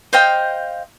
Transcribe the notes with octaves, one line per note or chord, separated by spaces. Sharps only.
C5 D#5 F5 G5